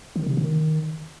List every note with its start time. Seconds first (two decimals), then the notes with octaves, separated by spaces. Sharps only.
0.16 D#3
0.26 C3
0.37 D#3